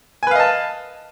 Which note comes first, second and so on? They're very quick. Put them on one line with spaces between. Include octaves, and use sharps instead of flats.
G#5 B4 F5 D#5 A5